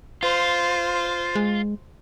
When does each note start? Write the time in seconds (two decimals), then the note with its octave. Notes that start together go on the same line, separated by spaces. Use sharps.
0.23 F4 C5
1.36 G#3